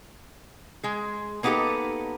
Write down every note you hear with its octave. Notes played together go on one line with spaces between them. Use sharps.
G#3 G#4
A#3 B3 D#4 E4 G4 A4